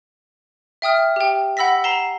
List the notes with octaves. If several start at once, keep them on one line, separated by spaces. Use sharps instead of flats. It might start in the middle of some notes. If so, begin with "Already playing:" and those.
E5 G5 D#6 F6
G4 G5
F#5 B5 E6 A#6 B6
A#5 C7 E7 G7